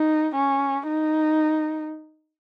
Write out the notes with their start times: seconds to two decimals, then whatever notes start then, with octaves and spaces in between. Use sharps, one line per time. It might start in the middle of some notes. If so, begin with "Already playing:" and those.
Already playing: D#4
0.35 C#4
0.88 D#4